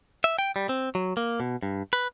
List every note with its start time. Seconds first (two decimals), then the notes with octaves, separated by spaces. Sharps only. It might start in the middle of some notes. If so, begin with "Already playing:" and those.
0.24 E5
0.39 G5
0.56 G3
0.69 C4
0.95 F#3
1.17 A#3
1.40 B2
1.63 G2
1.93 B4